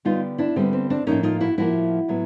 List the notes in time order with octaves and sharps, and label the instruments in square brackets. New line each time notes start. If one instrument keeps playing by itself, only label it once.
[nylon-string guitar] D3 G3 B3 D#4 F4
D4 E4
D3 G3 B3 C4
C4
C4 D4
A2 F3 A#3 C#4 D#4
D#4 F4
E4 F#4
A2 F3 A#3 E4 F#4
A2 F#3 B3